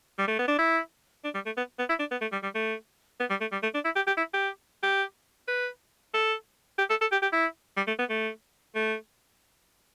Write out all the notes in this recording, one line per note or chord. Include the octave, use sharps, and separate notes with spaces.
G3
A3
B3
D4
E4
D4
G3
A3
B3
B3
E4
D4
B3
A3
G3
G3
A3
B3
G3
A3
G3
A3
D4
E4
G4
G4
E4
G4
G4
B4
A4
G4
A4
A4
G4
G4
E4
G3
A3
B3
A3
A3